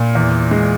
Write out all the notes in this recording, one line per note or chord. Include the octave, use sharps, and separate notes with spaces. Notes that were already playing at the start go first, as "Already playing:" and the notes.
Already playing: A#2
E2
G#3